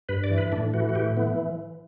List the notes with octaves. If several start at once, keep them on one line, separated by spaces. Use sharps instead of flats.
G2 B4
D5
E3
B4
A2 D4
E3 F#4
F#4
A2 G4
E3 B3